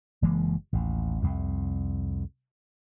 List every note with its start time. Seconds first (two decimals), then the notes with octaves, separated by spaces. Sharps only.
0.22 F#1 E3 G#3 A#3
0.73 A1 D#2
1.22 C2 F2